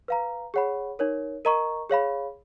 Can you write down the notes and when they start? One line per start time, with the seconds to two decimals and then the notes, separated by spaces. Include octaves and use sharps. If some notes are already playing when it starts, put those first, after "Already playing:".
0.08 B4 F5 A#5
0.54 G#4 C#5 F#5 B5
0.99 D#4 A#4 C#5
1.45 A#4 D#5 A#5 C#6
1.90 G#4 C#5 F5 B5